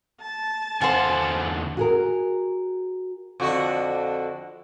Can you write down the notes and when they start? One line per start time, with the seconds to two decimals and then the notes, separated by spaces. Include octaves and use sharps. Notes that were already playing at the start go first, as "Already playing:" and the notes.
0.22 A5
0.81 E2 D3 C5 F5 F#5 G#5
1.77 F#4 G#4 A#4
3.40 F2 D3 F#4